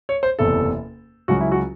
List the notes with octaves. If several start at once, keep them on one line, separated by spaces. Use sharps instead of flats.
C#5
C5
F#1 E2 C3 A4
C#2 C#3 F#3 C#4 F#4
E4
F#4